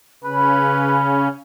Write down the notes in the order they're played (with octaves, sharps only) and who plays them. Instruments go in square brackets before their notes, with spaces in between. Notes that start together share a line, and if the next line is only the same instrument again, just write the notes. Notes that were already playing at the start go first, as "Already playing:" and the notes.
[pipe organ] C#3 C#4 [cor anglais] B4 [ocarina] B5